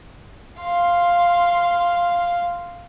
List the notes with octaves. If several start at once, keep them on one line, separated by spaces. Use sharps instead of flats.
F5 C6